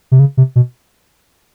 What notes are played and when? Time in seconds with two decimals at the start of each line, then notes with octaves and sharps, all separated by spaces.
0.12 C3
0.20 C#3
0.37 C3
0.56 B2